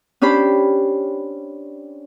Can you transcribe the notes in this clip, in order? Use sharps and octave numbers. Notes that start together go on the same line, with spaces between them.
C#4 D4 G4 C5 B5